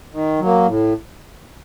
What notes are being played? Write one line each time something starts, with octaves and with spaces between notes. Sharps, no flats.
D#3
F#3 A#3
A2